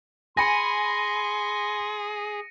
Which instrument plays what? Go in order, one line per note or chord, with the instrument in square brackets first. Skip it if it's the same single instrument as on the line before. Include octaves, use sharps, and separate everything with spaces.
[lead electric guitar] G#4 [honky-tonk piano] G#5 B5 [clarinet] C6 [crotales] A#6 C#7 D#7